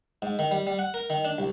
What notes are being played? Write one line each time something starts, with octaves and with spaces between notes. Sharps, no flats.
G#2
D#3
G3
G3
F#5
A#4
D#3
D4
C2